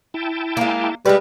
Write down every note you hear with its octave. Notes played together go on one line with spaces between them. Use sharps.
E4 G5 A5
G#3 A#3
G3 G#3 B4 D5